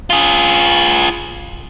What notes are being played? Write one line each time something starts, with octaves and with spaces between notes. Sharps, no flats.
F4 G#4